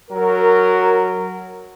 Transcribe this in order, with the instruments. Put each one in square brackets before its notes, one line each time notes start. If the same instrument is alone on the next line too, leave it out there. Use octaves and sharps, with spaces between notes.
[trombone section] F#3 F#4 A#4